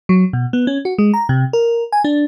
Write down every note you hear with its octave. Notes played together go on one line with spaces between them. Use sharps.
F#3
B2
B3
C#4
F#4
G#3
A#5
C3
A#4
G#5
D4